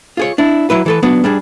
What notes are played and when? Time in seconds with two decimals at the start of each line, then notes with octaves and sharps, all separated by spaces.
0.17 F4 G#4 C#5
0.38 D4 E4
0.70 F#3 E4 B4
0.86 E3 A4 B4
1.03 F#3 B3 D4
1.24 G3 D4 G#4